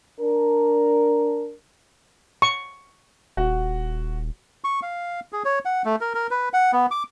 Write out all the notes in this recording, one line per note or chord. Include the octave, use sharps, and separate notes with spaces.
D4 A#4
C#6
D#1 F#4
C#6
F5
G#4
C#5
F#5
A3
A#4
A#4
B4
F#5
B3
D6